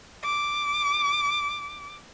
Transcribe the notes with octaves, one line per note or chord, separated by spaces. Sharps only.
D6